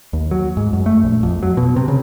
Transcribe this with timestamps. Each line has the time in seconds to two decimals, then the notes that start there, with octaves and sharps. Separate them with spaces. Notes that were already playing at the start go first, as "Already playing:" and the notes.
0.13 D#2
0.31 F#3
0.57 G#2
0.73 F#2
0.86 A3
1.03 A#1
1.23 F2
1.43 F#3
1.57 B2
1.76 C3
1.88 C#3